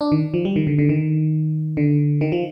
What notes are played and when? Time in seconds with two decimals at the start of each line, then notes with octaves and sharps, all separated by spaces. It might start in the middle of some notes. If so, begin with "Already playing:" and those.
0.01 D4
0.12 D#3
0.34 F3
0.45 G3
0.56 D#3
0.67 D3
0.79 D3
0.89 D#3
1.77 D3
2.21 D#3
2.32 F3